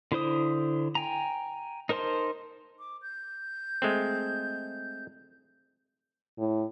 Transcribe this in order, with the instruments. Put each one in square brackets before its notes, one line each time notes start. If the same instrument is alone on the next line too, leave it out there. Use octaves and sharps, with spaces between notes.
[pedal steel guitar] D3 E4 C5 D#6
G5 G#5 A#5
D#4 A#4 C5 A5 C6
[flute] D6
G6
[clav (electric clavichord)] G#3 A3 C4
[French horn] A2